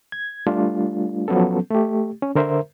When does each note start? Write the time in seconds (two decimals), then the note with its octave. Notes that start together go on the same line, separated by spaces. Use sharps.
0.12 G#6
0.47 G3 A3 D4 F4
1.28 F3 F#3 B3 C#4 A4
1.71 A3 G4
2.22 C#4
2.35 D3 A#4 C5 E5